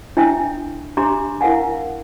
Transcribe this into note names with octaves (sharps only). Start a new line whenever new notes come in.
D4 E4 E5 G5 G#5
D4 G4 E5 A#5 C6 D6
E4 A#4 F5 F#5 G#5